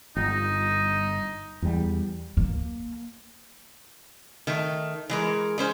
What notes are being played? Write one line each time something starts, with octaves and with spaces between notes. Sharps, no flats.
G1 D#4
E2 G3
A#3
D#3 A3
E3 G#3 A#4
G#3 C#4 C5